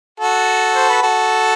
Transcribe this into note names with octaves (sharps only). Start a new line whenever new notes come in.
F#4 A4
C5
B4
F#4 A4